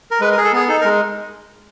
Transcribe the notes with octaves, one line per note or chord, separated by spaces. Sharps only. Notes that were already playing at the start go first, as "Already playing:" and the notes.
A#4
G#3 B4
A#4
G#4
A4
B3 G#4
D#4 A4
A#4
G#3